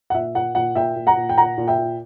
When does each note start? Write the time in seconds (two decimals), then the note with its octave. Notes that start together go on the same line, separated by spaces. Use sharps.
0.10 F#5
0.14 A#2 E5
0.35 A#2 F#5
0.55 A#2 F#5
0.75 A#2 E5 G5
0.96 A#2
1.07 F#5 A#5
1.17 A#2
1.29 G5
1.38 A#2 F#5 A#5
1.57 A#2
1.68 E5 G5
1.78 A#2